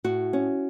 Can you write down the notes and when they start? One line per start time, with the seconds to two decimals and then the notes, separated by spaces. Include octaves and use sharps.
0.04 A2 F#4
0.33 C#4